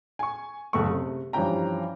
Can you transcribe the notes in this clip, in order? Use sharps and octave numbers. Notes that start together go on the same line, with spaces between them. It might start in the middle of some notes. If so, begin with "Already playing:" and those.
G#5 C#6
F#1 A3 B3 C#6
C3
G2 E3 F3 C#4 G5 A#5